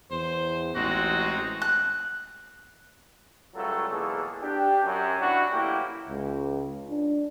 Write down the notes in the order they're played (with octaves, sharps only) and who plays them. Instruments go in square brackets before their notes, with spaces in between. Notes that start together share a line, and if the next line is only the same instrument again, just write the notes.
[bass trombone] E2 [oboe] C5
[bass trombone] A1 [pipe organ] G#3 C4 D#4 [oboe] F#4
[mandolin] F#6
[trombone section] C#2 F#3 G3 A3 F4 A4
E2 B2 F#3 A#3 G#4 A4
D4 G4
F#2
B2 D4 E4 F#4
A1 A2 F#3 A#3 E4 G4
[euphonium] C#2
D4